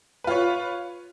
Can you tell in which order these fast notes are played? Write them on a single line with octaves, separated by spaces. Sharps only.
B4 F4 C#5